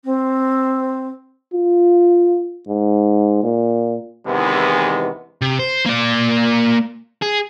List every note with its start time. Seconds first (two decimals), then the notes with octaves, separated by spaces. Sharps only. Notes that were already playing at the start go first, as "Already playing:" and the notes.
0.04 C4
1.53 F4
2.68 G#2
3.43 A#2
4.26 E2 C3 D#3 E3 G#3 B3
5.41 C3
5.59 C5
5.86 A#3 D5
7.22 G#4